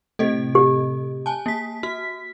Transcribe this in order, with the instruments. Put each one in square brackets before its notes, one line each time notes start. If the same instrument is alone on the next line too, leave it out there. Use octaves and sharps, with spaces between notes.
[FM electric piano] A2 C3 [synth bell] A4 D#5
[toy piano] G4
[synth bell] G#5 A5
A#3 B6
[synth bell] F#4 [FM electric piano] B6